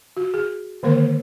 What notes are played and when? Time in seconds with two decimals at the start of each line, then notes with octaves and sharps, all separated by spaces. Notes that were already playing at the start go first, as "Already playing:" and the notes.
0.17 F#4
0.34 G#4
0.83 D3 D#3 G#3 A#3 A#4 C5